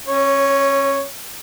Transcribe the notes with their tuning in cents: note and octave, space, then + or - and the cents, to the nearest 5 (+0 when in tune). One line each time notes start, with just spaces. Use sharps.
C#4 -30 C#5 +0